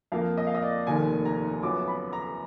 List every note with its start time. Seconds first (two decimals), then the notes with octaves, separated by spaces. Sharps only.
0.12 F2 F3 A#3 F5
0.37 D#5
0.47 F5
0.55 D#5
0.62 D5
0.87 F1 D#2 D#3 G#5
1.25 A#5
1.62 F#2 F3 B3 D6
1.88 B5
2.13 A#5